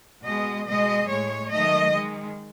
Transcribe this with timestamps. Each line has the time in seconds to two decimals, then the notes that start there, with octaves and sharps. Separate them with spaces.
0.25 B2 G#3 D#5
0.66 B2 G#3 D#5
1.08 A2 G#3 C#5
1.51 D#3 F#3 A3 D#5
1.92 D#3 G#3